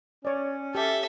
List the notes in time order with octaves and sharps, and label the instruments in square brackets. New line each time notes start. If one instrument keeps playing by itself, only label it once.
[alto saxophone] C#4 [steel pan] C#5 D5
[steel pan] G4 [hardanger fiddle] A4 E5